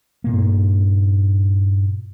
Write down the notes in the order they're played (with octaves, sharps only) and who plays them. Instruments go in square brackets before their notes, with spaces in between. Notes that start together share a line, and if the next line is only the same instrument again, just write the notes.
[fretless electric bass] G2 A#2 A#3